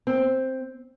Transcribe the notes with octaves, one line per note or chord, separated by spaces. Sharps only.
C4